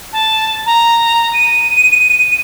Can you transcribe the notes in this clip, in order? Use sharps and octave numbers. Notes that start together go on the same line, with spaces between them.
A5
A#5
D#7